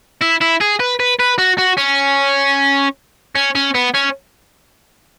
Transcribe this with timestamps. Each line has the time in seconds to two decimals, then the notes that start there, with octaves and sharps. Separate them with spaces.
0.21 E4
0.41 E4
0.61 G#4
0.80 B4
1.00 B4
1.20 B4
1.39 F#4
1.58 F#4
1.78 C#4
3.36 C#4
3.55 C#4
3.75 B3
3.95 C#4